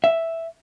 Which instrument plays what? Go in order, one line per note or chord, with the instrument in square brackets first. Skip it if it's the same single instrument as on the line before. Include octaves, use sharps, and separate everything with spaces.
[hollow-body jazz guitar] E5